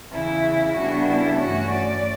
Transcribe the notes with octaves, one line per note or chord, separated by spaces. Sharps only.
E2 C#3 E3 E4
C#3 G3 B3 D4 F#4
E4
G2 E3 A3 C#4 F#4
D5